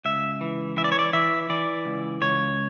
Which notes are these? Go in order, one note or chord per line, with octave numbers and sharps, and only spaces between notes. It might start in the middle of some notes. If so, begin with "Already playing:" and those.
C#2 E5
E3
E3 E5
D5
C#5
D5
E3 E5
E3 D5
C#2
C#2 C#5